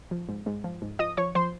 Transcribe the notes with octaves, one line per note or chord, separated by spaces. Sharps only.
F3
G#2
G#2
F3
G#2
F3 D#5 D#6
F3 C#5 C#6
F3 C5 C6